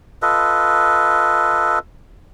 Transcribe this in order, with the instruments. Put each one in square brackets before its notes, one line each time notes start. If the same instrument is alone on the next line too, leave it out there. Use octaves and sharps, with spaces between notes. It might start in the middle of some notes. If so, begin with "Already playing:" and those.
[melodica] F4 A4 B4 D#5